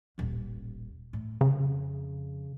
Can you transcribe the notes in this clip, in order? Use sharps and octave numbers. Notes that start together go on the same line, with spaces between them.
D#1 A1
A2
F2 C#3